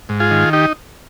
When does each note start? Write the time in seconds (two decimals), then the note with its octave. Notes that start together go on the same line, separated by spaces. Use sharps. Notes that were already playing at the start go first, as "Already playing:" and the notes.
0.09 G#2
0.20 F4 G#4
0.31 D#3
0.53 D#4 G4